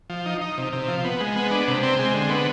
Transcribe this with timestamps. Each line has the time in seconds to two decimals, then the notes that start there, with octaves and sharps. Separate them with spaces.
0.10 F3
0.26 D#4
0.41 D#4
0.58 C3
0.73 C3
0.88 F3
1.05 B3
1.20 G#3
1.36 B3
1.51 D4
1.68 C3
1.83 C4
1.99 G#3
2.14 D3
2.30 B3